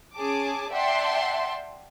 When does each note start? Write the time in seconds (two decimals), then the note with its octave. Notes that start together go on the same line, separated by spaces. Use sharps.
0.15 C#4 G#4 A5 D6
0.71 D5 E5 F#5 G5 A5 C6